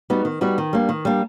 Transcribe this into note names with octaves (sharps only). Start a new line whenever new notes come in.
G3 B3 D#4 F#4
D#3
G3 B3 D#4 F#4
D#3
G3 A#3 D4
D#3
G3 A#3 D4